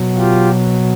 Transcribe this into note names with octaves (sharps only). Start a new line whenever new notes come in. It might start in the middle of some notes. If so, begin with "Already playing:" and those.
Already playing: B2 F#3
F4 G4